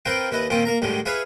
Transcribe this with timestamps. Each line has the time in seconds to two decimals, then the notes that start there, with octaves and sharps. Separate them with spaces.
0.05 C4 F4 A#4 B4 G5 C6
0.31 D#2 E4 B4 D#5
0.50 A#2 D#3 C4 C#4 F4
0.65 A#3 A#4 A#5
0.82 A2 D3 D#3 G3 G#3
1.06 E4 G#4 B4 C#5 E5 F5